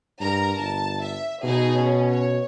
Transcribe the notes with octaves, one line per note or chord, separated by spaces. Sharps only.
G2 A#4 A#5
G1 A5
E5
B2 D#4 G#4
C#4
C#5